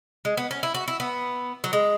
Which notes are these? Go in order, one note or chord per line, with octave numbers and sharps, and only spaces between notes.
G#3
B3
C#4
E4
F#4
E4
B3
F#3
G#3